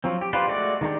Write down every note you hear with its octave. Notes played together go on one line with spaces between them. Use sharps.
F3 F#3 C4
G4
D4 F4 G4 B4 C5
G#3 A3 F#4 D5
D#3 G#3 D4 G4